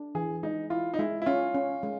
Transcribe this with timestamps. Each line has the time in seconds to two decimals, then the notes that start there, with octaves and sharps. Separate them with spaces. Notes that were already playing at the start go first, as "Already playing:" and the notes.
Already playing: D4
0.15 E3 G#4
0.43 G#3 D#4
0.70 E4 F4
0.94 D#4
0.99 G#3 E4
1.22 E4
1.26 C#4 F4
1.54 C#4
1.83 G#3